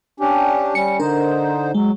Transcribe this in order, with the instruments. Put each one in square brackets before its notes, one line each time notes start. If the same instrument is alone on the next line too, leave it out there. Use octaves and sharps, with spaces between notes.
[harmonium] C#4 D4 G4
[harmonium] G3 C#4 [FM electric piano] C#7
[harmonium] D3 D#4 C5 [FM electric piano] D4 A#4
[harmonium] F#3 [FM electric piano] G#3